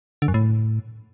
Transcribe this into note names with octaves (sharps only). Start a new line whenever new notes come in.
D3
F#2
A2